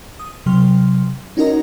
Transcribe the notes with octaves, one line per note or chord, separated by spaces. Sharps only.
D#6
C3 F#3 C6 F6
C#4 D#4 F#4 A#4 D#5 A#5